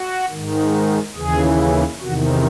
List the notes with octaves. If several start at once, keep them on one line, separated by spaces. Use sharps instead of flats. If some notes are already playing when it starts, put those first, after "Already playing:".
Already playing: F#4
G#2 D#3
D#2 C#3 E3 G#4
E2 C3 D#3 F#4